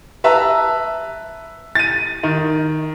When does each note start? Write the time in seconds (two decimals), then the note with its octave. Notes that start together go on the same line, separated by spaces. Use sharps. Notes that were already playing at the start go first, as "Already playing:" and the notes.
0.24 B4 E5 A5 A#5
1.75 A6 D#7
2.23 D#3